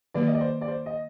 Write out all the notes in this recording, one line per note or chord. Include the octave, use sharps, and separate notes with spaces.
D#3 F#3 A#3 D5
D#5
D5
C5
D5
C5
D#5